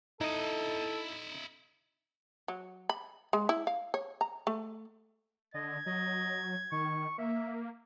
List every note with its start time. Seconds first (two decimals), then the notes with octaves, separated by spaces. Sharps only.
0.21 D#4 E4 A4 D#5
2.48 F#3
2.89 B5
3.33 G#3
3.49 E4
3.67 F5
3.94 C#5
4.21 A#5
4.47 A3
5.54 D3 D#5 G#6
5.86 F#3 D#5
6.72 D#3 C#6
7.18 A#3 E5